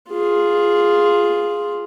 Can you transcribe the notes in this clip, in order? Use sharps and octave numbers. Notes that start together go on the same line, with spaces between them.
F4 G#4